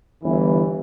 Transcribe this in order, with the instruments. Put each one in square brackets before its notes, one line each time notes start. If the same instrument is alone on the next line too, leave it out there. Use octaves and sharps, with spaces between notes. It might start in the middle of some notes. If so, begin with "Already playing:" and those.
[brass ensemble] G1 E3